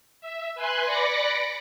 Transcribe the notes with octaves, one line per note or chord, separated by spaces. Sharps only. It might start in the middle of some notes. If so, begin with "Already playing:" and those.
E5
B4 G#5 C6 F#6
D5 B5 D6 A#6 C#7